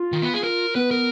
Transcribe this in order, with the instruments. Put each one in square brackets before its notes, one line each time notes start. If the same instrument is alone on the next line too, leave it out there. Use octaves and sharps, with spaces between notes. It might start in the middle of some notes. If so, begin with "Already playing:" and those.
Already playing: [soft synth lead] F4
[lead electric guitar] D#3
B3
G#4
A#4
[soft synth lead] B3 [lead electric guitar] B4
[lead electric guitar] A#4